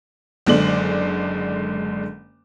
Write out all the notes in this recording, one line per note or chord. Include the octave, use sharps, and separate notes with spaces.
F#1 D3 G#3 D5 F#7